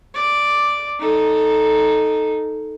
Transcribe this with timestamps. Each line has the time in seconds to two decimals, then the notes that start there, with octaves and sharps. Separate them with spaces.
0.14 D5
0.99 D#4 A4